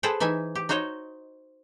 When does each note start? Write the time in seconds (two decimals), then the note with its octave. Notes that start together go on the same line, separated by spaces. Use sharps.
0.03 G#4 A4 B4 C5 F#5 G5
0.20 E3 D#4 E5 G#5
0.55 G4
0.69 D#4 F#4 C5 C#5 D#5